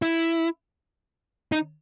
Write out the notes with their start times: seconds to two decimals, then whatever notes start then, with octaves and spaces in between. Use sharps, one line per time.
0.02 E4
1.52 D#4